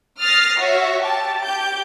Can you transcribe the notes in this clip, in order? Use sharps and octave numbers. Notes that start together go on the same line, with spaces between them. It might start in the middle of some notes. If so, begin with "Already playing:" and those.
D#6 F6 A6 A#6 C7
F#4 C#5 E5
G4 A5
G4 G6 D7